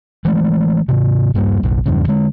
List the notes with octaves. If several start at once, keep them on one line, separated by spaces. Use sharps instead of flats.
E3 G#3 A3
G#2 C3
D#1 G2 G3 A#3
F#1 B1
E2 G2 C#3
D3 G#3